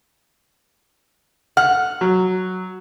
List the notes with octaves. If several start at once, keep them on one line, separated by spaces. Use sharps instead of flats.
F#5 F6
F#3